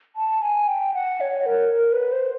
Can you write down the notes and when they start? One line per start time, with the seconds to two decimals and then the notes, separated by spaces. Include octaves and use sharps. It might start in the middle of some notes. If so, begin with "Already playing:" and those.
0.16 A5
0.42 G#5
0.67 G5
0.94 F#5
1.21 C#5
1.46 A#4
1.73 A#4
1.92 B4
2.12 C5